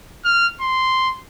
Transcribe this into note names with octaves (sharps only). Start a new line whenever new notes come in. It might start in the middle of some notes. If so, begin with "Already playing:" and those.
F6
C6